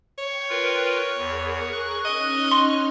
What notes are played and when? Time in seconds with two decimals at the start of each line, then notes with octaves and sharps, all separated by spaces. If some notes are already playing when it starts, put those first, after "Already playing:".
0.19 C#5 G5
0.50 F4 A#4 B4
1.18 E2 G#4 A#4
1.72 C#6 F#6
2.05 C#4 D#4 D#5 F6
2.51 C6